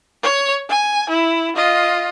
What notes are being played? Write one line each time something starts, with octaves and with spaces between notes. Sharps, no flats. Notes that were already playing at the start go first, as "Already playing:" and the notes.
C#5
G#5
E4
F4 D#5